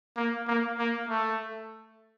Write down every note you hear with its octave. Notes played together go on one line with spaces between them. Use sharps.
A#3
A#3
A#3
A3